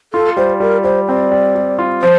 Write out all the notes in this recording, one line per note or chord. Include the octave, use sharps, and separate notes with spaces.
F4 A4
G3 C5
G3 A#4
G3 C5
C4 D5
G3
G3
F4
F3 C5